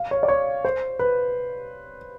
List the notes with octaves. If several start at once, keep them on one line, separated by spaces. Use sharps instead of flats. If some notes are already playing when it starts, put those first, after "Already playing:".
Already playing: F5
C#5
D5
C#5
C5
B4